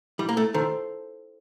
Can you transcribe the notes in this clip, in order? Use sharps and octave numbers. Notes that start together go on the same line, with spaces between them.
G3 E4
A#3
A3
D#3 A4 C5